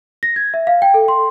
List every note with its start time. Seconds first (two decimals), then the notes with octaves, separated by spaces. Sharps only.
0.23 A#6
0.36 G#6
0.54 E5
0.67 F5
0.82 G5
0.94 A4
1.08 C6